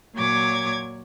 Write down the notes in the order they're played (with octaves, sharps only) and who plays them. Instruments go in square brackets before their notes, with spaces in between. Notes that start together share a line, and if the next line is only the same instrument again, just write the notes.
[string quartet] A#2 F#3 C#5 D6 G#6